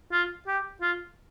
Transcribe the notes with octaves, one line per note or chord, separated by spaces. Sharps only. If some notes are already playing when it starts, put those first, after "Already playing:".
F4
G4
F4